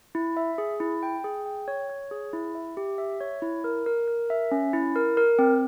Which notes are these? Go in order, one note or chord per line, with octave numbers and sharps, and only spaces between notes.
E4
E5
G#4
E4
G5
G#4
G5
C#5
C#5
G#4
E4
E5
G4
E5
C#5
E4
A#4
A#4
A#4
E5
C#4
E4
A#4
A#4
C4